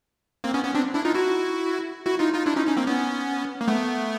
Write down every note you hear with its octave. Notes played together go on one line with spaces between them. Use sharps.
A#3 C4
B3 C#4
B3 C#4
C4 D4
D4 E4
D#4 F4
E4 F#4
E4 F#4
D#4 F4
D#4 F4
D4 E4
C#4 D#4
C#4 D#4
A#3 C4
B3 C#4
A#3
A3 B3